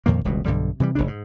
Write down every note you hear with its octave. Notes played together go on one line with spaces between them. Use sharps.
F2 A#2 D#3 A#3
E1 C#2 B2 G3
B1 G2 D3 G3
C3 E3 F#3 G3
F1 B1 C#3 D4
G#2